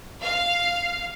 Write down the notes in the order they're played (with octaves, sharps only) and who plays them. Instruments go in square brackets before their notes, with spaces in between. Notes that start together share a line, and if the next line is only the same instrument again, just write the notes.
[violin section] F5